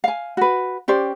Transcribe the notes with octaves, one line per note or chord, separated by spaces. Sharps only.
F5 G#5
F#4 B4
C#4 G4 C5 D5